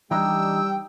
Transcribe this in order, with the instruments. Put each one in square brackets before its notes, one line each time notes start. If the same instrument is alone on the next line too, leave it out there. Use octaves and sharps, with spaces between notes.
[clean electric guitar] E3 D4 D#4 [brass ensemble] G3 G4 [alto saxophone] G5 [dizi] E6